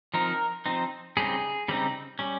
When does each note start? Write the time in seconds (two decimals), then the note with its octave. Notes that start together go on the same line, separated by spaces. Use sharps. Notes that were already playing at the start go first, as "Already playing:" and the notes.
0.14 F3 C4 D#4 A#4
0.66 F3 C4 D#4
1.17 C#3 G3 C4 D#4 G#4
1.68 C#3 G3 C4 D#4
2.19 G3 C#4